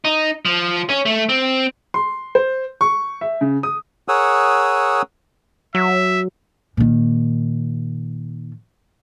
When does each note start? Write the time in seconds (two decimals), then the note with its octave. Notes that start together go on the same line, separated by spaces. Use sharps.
0.05 D#4
0.45 F3
0.89 C#4
1.05 A3
1.29 C4
1.94 C6
2.35 C5
2.81 C#6
3.21 E5
3.41 C#3
3.63 D#6
4.08 G#4 A#4 C#5 F#5 D#6 E6
5.75 F#3 E5
6.77 A#2 D#3